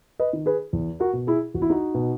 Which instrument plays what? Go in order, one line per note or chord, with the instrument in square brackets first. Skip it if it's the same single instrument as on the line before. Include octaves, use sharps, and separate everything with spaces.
[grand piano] B4 D#5
D#3
G#4 B4
E2
F#4 A#4
B2
E4 G#4
E2 F#4
E4
D#4 F#4
B2